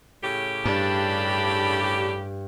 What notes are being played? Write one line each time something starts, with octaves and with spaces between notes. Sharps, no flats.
A2 C#3 G4
G2 D4 A5 B5